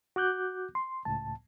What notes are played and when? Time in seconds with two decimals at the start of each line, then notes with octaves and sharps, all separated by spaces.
0.16 F#4 D6 F#6 G6
0.75 C6
1.05 C#2 A2 A5